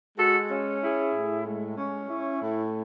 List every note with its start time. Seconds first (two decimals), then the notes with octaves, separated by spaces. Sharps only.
0.17 G#3 F#4 A4
0.49 C#4
0.81 E4 G#4
1.13 A2
1.45 G#3
1.77 C#4
2.09 E4
2.41 A2